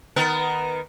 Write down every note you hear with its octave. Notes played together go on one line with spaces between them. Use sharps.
D#3 B3 A#4